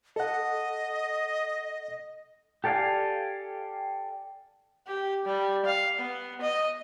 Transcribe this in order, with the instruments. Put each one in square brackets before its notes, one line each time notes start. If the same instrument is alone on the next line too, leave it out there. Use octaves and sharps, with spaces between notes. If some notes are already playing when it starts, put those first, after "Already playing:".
[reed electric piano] A4 F#5 [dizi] D#5
[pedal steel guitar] G4 A4 D5 F5 G#5
[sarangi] G4
G3
F5
B3
D#5